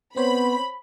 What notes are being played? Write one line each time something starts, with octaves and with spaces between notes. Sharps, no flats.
B3 C4 C5 C#5 B5